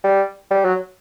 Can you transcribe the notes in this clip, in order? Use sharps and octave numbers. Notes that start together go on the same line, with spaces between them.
G3
G3
F#3